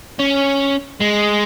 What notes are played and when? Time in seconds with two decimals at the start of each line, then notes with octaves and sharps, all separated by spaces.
0.20 C#4
1.00 G#3